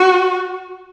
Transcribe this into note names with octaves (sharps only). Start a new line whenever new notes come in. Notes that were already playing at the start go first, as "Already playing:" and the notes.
Already playing: F#4